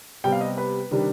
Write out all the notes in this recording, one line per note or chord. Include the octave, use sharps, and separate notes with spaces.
C3 G3 B3 G5
F5
D#5
B4
C3 D#3 G3 D4